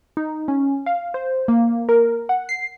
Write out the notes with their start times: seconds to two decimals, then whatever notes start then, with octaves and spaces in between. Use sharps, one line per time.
0.17 D#4
0.48 C#4
0.86 F5
1.14 C5
1.48 A#3
1.89 A#4
2.29 F#5
2.49 C7